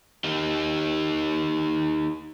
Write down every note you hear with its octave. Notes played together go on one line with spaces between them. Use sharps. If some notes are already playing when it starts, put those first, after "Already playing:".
D#4 G4 A#4 D#5